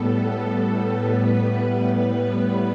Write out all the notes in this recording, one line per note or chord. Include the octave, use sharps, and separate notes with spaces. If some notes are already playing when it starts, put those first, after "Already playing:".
Already playing: A2 G3 B3 A4
A2 G3 B3 B4